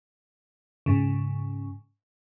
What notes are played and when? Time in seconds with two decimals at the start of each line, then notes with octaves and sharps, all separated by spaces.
0.86 G#2 C#3